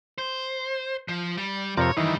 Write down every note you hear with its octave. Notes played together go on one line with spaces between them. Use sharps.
C5
F3
G3
F2 C3 A#4 C#5 D5
F#2 D#3 E3 G3